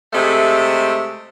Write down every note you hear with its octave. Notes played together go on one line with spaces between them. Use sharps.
C3 G#3 A3